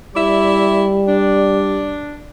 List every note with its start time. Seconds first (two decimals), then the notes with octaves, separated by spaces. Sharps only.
0.15 G3 E4 D5 E5
1.07 D4